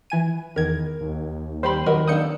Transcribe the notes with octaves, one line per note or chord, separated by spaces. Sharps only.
E3 G#5 D#7
E2 D#3 A#4 G#6
D#2
G3 G4 C5 B5 C6
D#3 F#3 A#4 B4 D#5
A#3 D4 A4 D#6 G6 C#7